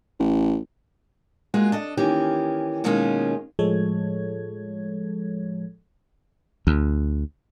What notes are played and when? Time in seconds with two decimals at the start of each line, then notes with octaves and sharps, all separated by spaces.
0.20 A1
1.54 G#3 A#3 F4 F#4 G#4
1.72 D4 A4 D#5
1.97 D#3 E3 A#3 C#4 G4
2.84 B2 D#3 G#3 A#3 C#4 F4
3.59 A2 F3 G#3 A4 C#5 G#6
6.67 D2